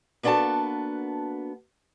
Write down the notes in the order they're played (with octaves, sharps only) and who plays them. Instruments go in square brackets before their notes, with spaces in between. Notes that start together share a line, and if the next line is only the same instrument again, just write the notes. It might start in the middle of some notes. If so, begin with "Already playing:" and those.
[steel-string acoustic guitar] A#3 B3 D4 F#4 A4 A5